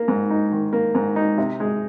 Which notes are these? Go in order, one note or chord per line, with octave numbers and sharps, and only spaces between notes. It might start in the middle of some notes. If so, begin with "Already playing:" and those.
Already playing: A#3
G#2
D#4
D#3
A#3
G#2
D#4
C3
G#3